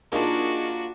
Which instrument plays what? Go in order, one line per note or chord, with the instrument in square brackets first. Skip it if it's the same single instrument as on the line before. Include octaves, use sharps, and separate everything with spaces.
[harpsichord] A#3 F4 [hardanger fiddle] D4 F#4 [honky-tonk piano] D#4 G#4 A#4